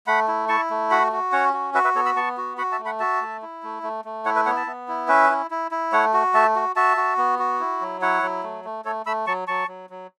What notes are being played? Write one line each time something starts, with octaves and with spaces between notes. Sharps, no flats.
A3 F#5 B5
E4
E4 A5 C#6
A3
F#4 F#5 B5
F#4
C#4 C#5 F#5
F#4
F#4 B4 E5
B4 E5
B3 A4 C#5
B5 E6
B3 A5 C#6
F#4
F#4 F#5 B5
E5 A5
A3
F#5 B5
F#4 E5 A5
A3
E4
A3
A3
A3
E4 C#5 F#5
B4 E5
B3 C#5 F#5
E5 A5
B3
E4
C#4 B4 E5
E4
E4
E4
A3 C#5 F#5
F#4
A3 E5 A5
F#4
F#4 E5 A5
F#4
B3
F#4
E4
F#3
E4 C#5 F#5
F#3
A3
A3
A3 A4 C#5
A3 B5 E6
F#3 A5 C#6
F#3 A5 C#6
F#3
F#3